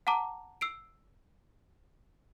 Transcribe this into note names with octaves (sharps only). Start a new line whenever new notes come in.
F#5 A5 A#5 D6
E6 C7 D7